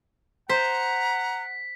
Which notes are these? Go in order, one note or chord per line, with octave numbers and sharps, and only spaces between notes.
C5 F#5 A#5 B6